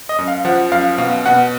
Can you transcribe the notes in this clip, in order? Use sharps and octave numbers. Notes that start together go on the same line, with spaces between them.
D#5
F#2
F5
F3 F#5
F#2 F5
B2 F5
B2 F#5